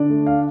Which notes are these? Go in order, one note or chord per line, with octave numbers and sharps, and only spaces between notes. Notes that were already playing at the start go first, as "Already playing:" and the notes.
Already playing: D3 D4 D5
A3
F5